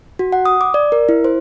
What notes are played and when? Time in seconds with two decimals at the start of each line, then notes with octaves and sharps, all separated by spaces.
0.19 F#4
0.32 F#5
0.45 D#6
0.61 D6
0.74 D5
0.92 A#4
1.09 E4
1.24 C5